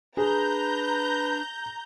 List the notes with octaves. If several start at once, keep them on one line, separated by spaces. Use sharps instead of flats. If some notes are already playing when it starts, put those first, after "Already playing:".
D4 G#4 B4 A#5 G6